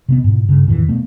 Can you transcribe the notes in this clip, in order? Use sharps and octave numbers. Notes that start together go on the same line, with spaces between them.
C3 A3 B3
G#2 B2
G2 C#3
E2 A2 D#3 E3
B2 A3 B3